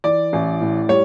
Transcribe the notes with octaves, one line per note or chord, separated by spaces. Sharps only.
E3 D5
A1
A2
G3 C#5